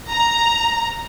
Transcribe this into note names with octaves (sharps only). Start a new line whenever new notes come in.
A#5